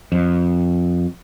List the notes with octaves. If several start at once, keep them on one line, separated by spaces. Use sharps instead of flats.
F2